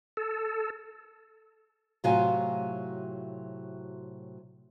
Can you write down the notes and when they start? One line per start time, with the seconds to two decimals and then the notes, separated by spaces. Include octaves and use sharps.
0.17 A4
2.04 A2 C3 F#3 F4 F#4 G#5